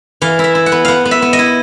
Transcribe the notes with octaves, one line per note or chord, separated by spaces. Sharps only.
E3 F5
E4 E5
E4
F#5
B3
B3 F5 F#5
B3
E5
B3
D#5
E4